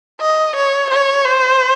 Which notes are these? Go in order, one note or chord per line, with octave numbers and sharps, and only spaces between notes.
D#5
C#5
C#5
C5